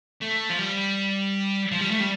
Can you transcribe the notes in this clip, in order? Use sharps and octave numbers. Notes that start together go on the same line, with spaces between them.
A3
F3
G3
F3
G3
A3
G3